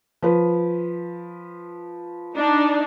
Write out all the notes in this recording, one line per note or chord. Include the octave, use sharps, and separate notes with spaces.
F3 B4
D4 D#4